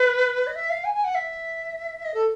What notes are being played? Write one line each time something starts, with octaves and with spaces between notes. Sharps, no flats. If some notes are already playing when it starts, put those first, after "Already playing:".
Already playing: B4
D#5
E5
F5
G#5
G#5
F#5
E5
D#5
A4